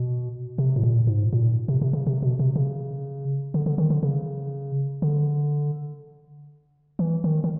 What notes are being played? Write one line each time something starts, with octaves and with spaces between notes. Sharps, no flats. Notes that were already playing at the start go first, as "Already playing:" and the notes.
Already playing: B2
C3
A2
A#2
G#2
A#2
C3
C3
C#3
C3
B2
C3
C#3
D3
D3
D#3
D3
C#3
D3
E3
D#3
D#3